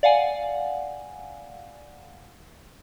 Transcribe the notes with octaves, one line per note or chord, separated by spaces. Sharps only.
D5 F5 F#5 G#5